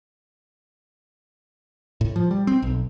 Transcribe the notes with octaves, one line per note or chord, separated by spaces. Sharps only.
A2
F3
G3
C4
B1